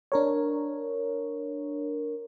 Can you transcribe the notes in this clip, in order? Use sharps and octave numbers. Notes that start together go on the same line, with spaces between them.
D4 A#4 C#5